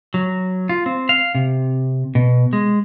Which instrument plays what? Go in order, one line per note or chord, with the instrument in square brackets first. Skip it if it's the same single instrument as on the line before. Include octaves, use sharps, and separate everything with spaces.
[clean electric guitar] F#3
F4
C4
F5
C3
B2
G#3